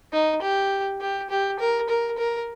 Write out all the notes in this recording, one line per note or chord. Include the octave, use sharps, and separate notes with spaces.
D#4
G4
G4
G4
A#4
A#4
A#4